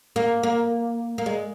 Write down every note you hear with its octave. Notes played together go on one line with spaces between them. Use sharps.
A#3
A#3
A#3
G#3